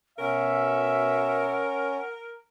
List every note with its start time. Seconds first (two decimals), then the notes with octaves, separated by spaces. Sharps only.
0.19 B2 C#4 A#4 E5 F#5